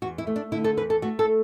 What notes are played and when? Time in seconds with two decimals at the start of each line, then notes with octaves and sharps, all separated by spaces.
0.02 E2 F#4
0.18 E4
0.27 A3
0.36 D4
0.52 D3 E4
0.64 A4
0.77 E2 B4
0.90 A4
1.02 A3 F#4
1.19 A4